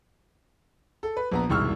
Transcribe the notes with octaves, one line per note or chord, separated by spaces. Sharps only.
A4
B4
A#1 B3 A#5
E1 C2 G#2 C#6 E6 F6